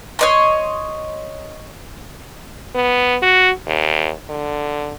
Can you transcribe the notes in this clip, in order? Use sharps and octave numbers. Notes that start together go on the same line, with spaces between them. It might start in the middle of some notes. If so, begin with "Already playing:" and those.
C#5 D#5 C6
B3
F#4
D#2
D3